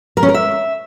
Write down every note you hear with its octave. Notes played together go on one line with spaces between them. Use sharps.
A#4
C#4
A#4
E5